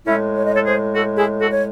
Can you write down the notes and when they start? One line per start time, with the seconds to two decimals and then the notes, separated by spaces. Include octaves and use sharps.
0.06 A2 G#3 C#4 E4
0.36 C#5
0.46 D#5
0.55 A4 C#5
0.66 G#4 C5
0.95 F#4 A4
1.17 E4 G#4
1.40 F#4 A4
1.51 C#5